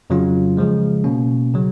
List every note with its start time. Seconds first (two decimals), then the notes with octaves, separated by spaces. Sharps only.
0.10 F2 C#3 F#3 C#4 F4
0.57 C#3 F3 G#3
1.04 B2 A#3 C#4
1.54 C#3 F#3